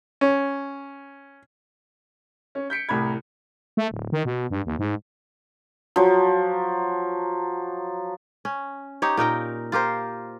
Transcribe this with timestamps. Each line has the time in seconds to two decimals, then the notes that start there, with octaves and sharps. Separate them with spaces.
0.21 C#4
2.55 C#4
2.70 G6 B6 C#7 D7
2.89 C2 A2 A#5 B5 G#6
3.77 A3
3.91 D1
4.12 D#3
4.25 B2
4.51 G2
4.66 D#2
4.79 G#2
5.96 F3 F#3
8.45 C#4
9.02 D#4 G4 C#5
9.17 A#2 D#4 A#4 G5
9.72 F4 G4 A#4 C5